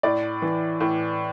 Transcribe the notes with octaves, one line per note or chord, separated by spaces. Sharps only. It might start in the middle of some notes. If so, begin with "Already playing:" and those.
A2 D5
E3
A2